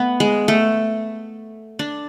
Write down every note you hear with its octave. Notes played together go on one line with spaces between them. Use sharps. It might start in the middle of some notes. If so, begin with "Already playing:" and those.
Already playing: A3 B3
G#3
A3
D4